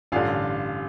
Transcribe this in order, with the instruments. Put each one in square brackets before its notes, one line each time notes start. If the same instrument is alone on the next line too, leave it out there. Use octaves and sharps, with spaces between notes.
[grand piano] A1 G2 D3 F4 F5